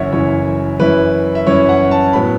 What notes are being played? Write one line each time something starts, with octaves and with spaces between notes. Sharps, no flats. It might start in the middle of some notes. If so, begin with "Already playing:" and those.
Already playing: F#1 F#2 E3 C#4 E4 C#5 E5 F#5
F#1 F#2 E3 C#4 E4 C#5
F#2 E3 C#4 E4 B4
E5
F#2 E3 C#4 E4 C#5
F#5
A5
A2 F#3 B3 B5